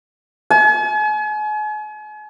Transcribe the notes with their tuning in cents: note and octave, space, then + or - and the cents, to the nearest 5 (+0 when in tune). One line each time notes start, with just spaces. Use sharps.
G#5 +40